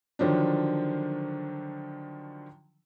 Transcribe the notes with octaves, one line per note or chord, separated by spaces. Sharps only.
D3 D#3 F3 F#3 D4